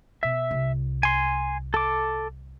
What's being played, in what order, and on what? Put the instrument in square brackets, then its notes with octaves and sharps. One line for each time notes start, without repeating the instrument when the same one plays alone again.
[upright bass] B2 [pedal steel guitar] E5
[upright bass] C2
[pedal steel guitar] G#5 C6
A4 D6